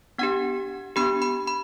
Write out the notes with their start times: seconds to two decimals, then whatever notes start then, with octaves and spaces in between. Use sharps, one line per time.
0.18 B3 D4 G4 F#5
0.96 B3 D4 G4 B5
1.22 B5
1.47 B5